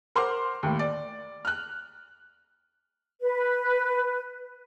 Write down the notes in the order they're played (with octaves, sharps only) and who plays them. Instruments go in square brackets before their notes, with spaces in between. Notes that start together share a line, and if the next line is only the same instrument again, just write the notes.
[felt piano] A#4 C5 F#5 C6 D6 F6
D#2 A2
D5
F6 F#6
[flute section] B4